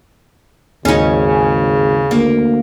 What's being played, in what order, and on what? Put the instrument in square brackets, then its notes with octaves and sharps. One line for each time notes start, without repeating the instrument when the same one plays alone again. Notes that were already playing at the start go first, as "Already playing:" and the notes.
[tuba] G#1 [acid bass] D#2 [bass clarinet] C#3 [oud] C#4 D#4
[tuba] D2 [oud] A#3